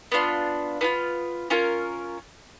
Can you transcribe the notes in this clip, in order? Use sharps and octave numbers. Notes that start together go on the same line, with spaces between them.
B3 D4 F4
B3 D4 F4
C#4 F4 A#4